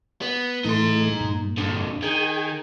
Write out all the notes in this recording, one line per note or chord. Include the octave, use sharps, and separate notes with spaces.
B3
A2 E3 A3 D#4 C6
G2 A#2
F2 D3
D#3 G#4 G5 G#6